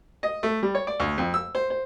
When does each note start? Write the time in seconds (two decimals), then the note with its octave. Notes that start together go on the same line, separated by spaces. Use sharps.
0.23 D#5
0.43 A3
0.63 G3
0.75 C#5
0.87 D5
1.00 D2
1.18 F2
1.34 E6
1.55 C5
1.70 C5